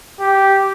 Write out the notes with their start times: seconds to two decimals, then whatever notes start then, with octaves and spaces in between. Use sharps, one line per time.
0.20 G4